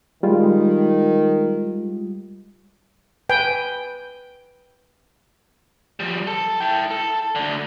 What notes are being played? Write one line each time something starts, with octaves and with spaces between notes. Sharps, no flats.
D#3 G3 G#3 F4
B4 G5 G#5
F3 G3
A4
E4 G5
A4
D2 D3